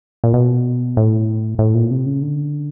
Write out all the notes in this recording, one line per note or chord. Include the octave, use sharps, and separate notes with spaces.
A#2
B2
A2
A2
A#2
C3
C#3
D3